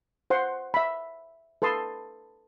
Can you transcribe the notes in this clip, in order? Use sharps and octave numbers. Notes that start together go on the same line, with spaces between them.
C5 F#5 C6
E5 B5
A4 B4 A5 C6 D#6